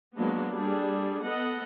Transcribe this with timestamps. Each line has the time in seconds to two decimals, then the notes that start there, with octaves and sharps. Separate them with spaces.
0.15 F#3 G#3 A#3 B3 D4
0.51 G3 D4 G#4 A4
1.22 B3 A4 D#5 F#5